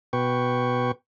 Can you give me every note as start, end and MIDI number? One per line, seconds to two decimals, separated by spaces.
0.13 0.92 47
0.13 0.92 71
0.13 0.92 79
0.13 0.92 85